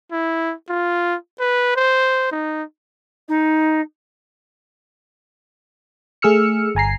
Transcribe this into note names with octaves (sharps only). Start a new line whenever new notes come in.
E4
F4
B4
C5
D#4
D#4
A3 G#4 E6 F6 C#7
G1 G#5 A#5 C7